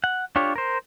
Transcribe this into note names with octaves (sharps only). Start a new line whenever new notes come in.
F#5
D4 F4 G4 C#5
A#4 C5